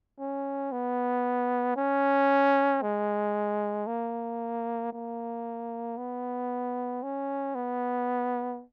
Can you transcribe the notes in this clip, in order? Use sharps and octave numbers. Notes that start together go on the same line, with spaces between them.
C#4
B3
C#4
G#3
A#3
A#3
B3
C#4
B3